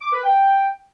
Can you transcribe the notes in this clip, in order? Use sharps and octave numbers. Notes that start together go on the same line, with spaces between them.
D6
B4
G5